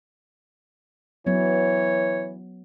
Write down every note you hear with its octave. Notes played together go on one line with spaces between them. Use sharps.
E3 F#3 B3 C#5